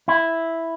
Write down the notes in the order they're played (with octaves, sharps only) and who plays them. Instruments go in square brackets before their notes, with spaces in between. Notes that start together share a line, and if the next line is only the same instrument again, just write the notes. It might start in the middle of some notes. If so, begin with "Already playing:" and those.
[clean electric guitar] E4